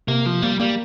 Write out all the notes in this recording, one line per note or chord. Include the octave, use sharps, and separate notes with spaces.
C3 A#3
F3
G3 A#3
G3 A#3